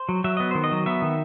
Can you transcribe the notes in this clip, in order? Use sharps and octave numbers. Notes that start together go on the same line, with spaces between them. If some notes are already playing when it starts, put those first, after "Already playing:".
Already playing: C5
F#3
F#3 E5
B3 D#5
D#3 C5
D#5
F#3
B3 E5
D#3